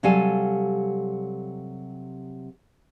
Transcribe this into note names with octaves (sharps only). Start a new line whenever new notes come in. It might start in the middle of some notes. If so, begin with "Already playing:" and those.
C3 F#3 G3 A4 F5 G#5